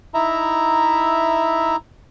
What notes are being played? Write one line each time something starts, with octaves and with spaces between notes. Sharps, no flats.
D#4 E4 E5 A#5